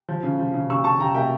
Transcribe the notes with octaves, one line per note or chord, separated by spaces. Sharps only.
F3
C#3
F3
C#3
C#3 C#6 E6
C#3 A5 C#6
C#3 G5 A#5
A#3 E5 G5